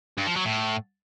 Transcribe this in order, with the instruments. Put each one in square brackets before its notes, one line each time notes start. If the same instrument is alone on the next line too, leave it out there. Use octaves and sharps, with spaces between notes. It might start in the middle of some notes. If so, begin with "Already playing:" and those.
[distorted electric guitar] G2
F3
F#3
A2